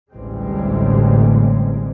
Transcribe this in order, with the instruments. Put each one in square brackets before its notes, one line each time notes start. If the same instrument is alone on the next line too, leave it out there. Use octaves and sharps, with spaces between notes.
[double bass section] A1 D2 C3 G3 G#3 C4